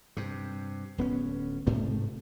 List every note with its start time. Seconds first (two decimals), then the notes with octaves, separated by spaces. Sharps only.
0.17 G2 C3
0.98 D1 B3 C#4
1.67 G#2 C3 A3